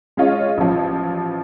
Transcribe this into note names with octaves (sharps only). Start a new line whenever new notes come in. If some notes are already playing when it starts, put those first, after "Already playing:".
G#3 C#4 F4 C#5 D#5
A1 F3